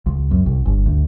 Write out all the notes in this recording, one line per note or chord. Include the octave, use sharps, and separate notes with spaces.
C#2
F#2
C2
G1
D2